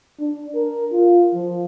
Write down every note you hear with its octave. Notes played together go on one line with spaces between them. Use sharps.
D4
A#4
F4
F3